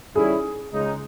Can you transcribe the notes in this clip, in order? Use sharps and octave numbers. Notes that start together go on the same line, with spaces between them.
D#3 G3 C#4 E4 G#4
C#2 C#3 G#3 D#4